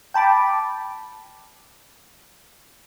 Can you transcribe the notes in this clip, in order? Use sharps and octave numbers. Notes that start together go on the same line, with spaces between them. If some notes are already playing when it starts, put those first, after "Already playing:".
G5 A5 B5 D6